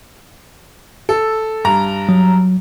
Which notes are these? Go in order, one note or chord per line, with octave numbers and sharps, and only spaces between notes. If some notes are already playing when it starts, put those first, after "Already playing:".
A4
G2 A#5
F#3